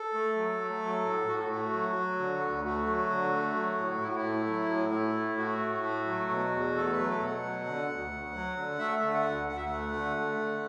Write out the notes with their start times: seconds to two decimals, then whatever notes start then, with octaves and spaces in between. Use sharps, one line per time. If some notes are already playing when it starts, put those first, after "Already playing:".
Already playing: A4
0.13 A3
0.37 F#3
0.59 A3
0.82 F#3
1.05 A2
1.27 A2 F#4
1.38 A4
1.50 A3 F#4
1.73 F#3
1.96 F#3
2.19 D3
2.41 D2
2.65 A3 F#4
2.87 F#3
3.10 D3
3.32 A3
3.55 F#3
3.78 A2
4.01 A2 E4
4.08 F#4
4.15 E4
4.24 A3
4.47 F#3
4.69 A2
4.92 A3
5.15 A2
5.37 A3 F#4
5.61 A2
5.83 A3
6.06 F#3
6.29 B2
6.51 E2
6.74 A3 A4
6.91 B4
6.98 F#3
7.08 A4
7.20 B2
7.25 F#5
7.43 F#3
7.66 D3
7.89 D2
8.11 D2
8.34 F#3
8.56 D3
8.79 A3 E5
9.02 D3
9.13 F#5
9.25 D2
9.48 D2 F#5
9.56 E5
9.66 A3 F#5
9.93 D3
10.17 A3
10.39 D3